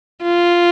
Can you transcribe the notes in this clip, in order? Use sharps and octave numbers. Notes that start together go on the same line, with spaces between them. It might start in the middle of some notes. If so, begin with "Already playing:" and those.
F4